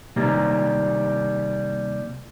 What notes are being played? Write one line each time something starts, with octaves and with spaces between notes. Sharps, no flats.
C3 D#3 G3 A#3